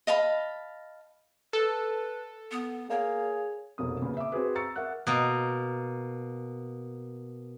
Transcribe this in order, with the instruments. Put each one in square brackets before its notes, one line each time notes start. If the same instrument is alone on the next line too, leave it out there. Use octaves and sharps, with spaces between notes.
[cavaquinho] D#5 F5 A5 B5
[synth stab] A4 [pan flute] B4
[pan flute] B3
[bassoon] A#3 [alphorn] G#4 [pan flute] C#5
[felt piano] F1 B1 A#3 D#6
A#2 C#3 B3
E5 D6
C4 F#4 G#4 B4
A#5 C#6 E6 A6 C#7
A#4 E5 F#5 F#6
[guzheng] B2 A#3